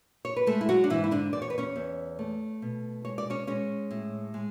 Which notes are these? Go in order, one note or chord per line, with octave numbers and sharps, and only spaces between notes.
C#5
B4
G#3 A3 A4
E4
F#3 F#4
D4
G#2 E3 E4
E4
D3 D4
E2 D5
C#5
B4
C#4 C#5
E2
A3
B2
G#3 C#5
D5
C#4 C#5
G#3 C#4 C#5
A2
G#3